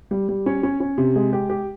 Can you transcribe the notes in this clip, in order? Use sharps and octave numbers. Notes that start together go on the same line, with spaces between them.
G3
G3
C#4
C#4
C#4
C3
G#3
G4
G4